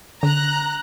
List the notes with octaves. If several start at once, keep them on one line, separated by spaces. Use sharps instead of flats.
D3 A#5 F#6